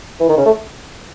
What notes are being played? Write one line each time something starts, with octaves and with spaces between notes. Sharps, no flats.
E3
D#3
C#3
A3